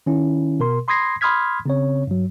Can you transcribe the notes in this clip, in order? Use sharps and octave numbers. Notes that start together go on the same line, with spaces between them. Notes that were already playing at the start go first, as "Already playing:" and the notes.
D#3 C#4 E4
B2 A#4 C6
B5 C6 D#6 G#6 A#6 C7
B5 C6 D#6 F6 G#6 B6
C#3 C4 C#5
G2 F#3